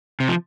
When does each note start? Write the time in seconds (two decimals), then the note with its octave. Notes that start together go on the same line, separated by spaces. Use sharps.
0.20 C3
0.28 F3